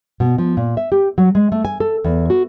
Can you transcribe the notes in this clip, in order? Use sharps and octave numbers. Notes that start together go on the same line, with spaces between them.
B2
F3
A#2
E5
G4
F#3
G#3
A3
G#5
A4
E2
F#4